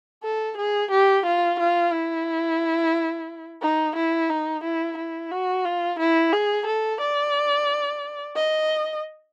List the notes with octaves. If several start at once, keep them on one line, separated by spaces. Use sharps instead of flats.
A4
G#4
G4
F4
F4
E4
D#4
E4
D#4
E4
E4
F#4
F4
E4
G#4
A4
D5
D#5